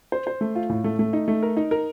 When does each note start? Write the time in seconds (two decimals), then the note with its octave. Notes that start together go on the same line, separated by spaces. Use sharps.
0.12 C5
0.27 C5
0.41 A3
0.55 F4
0.69 A2
0.84 A3
0.99 A3
1.13 D#4
1.28 A3
1.43 A#4
1.57 D#4
1.71 A#4